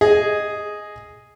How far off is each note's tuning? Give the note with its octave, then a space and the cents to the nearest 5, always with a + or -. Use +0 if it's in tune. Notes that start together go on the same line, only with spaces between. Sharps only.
G#4 +0 D#5 +0